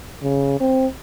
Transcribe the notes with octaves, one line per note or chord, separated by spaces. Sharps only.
C#3
C4